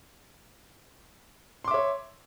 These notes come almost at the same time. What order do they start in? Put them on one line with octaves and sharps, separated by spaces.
C6 D6 E5 C#5